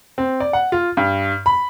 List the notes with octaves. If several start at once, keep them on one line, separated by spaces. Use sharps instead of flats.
C4
D5
F#5
F4
G2
B5